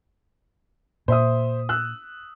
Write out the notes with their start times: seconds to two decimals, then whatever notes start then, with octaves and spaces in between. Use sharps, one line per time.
1.08 A#2 C5 E5 D#6
1.69 E6 F#6